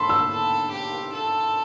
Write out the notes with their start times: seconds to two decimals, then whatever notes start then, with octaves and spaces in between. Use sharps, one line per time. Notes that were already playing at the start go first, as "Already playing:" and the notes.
Already playing: A4 A5 B5 C6
0.09 E6
0.32 A4
0.72 G4
1.14 A4